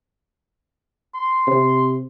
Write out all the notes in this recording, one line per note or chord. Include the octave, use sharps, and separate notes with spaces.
C6
C3